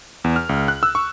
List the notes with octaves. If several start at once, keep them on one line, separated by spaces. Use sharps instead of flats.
E2
F6
C#2
F#6
E6
C#6